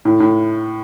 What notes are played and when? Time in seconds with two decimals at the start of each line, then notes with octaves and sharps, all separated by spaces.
0.05 A2
0.20 A2